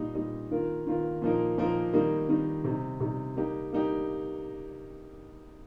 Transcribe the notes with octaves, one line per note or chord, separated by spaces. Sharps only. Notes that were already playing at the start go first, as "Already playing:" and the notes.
Already playing: A#2 G3 D#4
A#2 G3 D#4
D#3 A#3 F4 A#4
D#3 A#3 F4 A#4
A#2 F3 A#3 D#4 A#4
A#2 F3 A#3 D#4 A#4
D#3 G3 A#3 D#4
D#3 G3 A#3 D#4
C3 G3 D#4
C3 G3 D#4
G3 A#3 D#4 G4
G3 A#3 D#4 G4